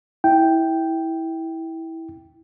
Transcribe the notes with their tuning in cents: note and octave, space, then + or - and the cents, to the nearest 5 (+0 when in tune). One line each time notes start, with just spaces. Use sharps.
E4 -15 G5 +0